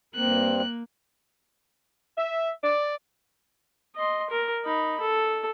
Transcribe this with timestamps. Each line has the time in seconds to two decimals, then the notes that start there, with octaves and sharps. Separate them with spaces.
0.16 G2 A#3 C4 F#6
2.17 E5
2.62 D5
3.96 D#5 C6
4.30 A#4
4.65 D#4 B5
5.01 A4